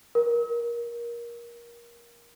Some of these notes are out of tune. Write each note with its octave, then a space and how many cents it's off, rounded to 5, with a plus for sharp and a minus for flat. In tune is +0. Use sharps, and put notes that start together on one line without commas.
A#4 +20